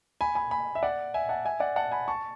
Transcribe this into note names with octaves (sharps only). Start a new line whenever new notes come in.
G#5 B5
G#5 B5
G#5 B5
E5
D5 F#5
E5 G#5
F#5 A5
E5 G#5
D5 F#5
F#5 A5
G#5 B5
A5 C#6